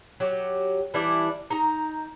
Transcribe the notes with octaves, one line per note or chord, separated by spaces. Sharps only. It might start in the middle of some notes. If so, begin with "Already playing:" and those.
F#3 F#4 G4
E3 G3 D4 E4
D#4 A#5